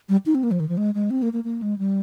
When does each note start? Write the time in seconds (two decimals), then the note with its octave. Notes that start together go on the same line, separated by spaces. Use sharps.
0.09 G3
0.26 D#4
0.35 C4
0.43 A#3
0.51 F3
0.60 D#3
0.69 F3
0.77 G#3
0.94 G#3
1.10 C4
1.22 A#3
1.33 A#3
1.44 A#3
1.62 G#3
1.78 G3